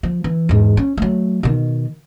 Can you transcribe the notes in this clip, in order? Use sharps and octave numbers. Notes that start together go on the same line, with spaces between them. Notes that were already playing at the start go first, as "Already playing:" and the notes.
F3
E3
E2 G#2
C#4
F#3 A3
B2 D#3